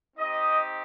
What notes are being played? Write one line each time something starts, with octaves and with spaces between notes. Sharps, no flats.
C4 D#4 G4 D#5